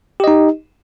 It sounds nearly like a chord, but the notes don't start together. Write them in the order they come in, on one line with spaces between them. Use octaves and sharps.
G4 D#5 D#4